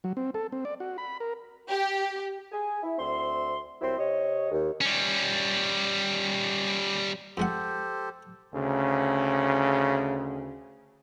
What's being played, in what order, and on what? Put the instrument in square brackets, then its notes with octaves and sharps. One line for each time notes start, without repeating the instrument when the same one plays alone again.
[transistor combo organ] F#3
C4
A4
C4
D5
F#4
B5
A#4
[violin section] G4
[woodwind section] G#4 G#5
E4
D2 C4 E5 C6
C2 F#3 C4 E4 C5 C6
C3 C#5 D#5
D#2
[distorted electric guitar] G3 C#4
[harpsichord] F2 G#3 F#5 [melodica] G4 A4 C5
[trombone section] D2 C#3